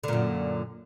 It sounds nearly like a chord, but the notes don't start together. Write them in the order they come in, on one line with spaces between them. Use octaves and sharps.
D3 A#2 F#2